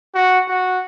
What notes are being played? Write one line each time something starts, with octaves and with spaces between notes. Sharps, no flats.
F#4
F#4